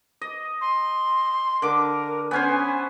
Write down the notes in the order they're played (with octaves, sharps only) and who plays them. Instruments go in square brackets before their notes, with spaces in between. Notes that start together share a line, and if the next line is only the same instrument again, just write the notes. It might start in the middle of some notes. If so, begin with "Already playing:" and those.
[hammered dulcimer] D#5
[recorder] C6
[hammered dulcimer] D3 D6 [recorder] A#4
[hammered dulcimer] B3 C#4 C5 [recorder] G#5